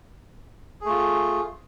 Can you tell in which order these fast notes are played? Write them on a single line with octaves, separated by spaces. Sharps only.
G#4 A3 F4